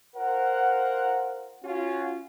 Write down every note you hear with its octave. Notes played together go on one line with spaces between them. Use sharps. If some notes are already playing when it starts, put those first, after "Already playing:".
F4 A#4 C5 F#5
C#4 F4 F#4